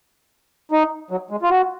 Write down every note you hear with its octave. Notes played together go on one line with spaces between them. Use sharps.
D#4
F#3
G#3
F4
F#4